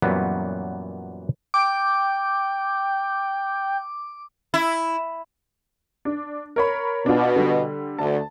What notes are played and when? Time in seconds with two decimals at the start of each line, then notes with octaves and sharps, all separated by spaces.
0.02 F#2 A#2 E3 F#3 G3 B3
1.54 G5 D6
4.54 E4
6.05 D4
6.56 A#4 C#5 B5
7.06 B2 D4 F4
7.36 D3 G3
7.99 D2 D3 A5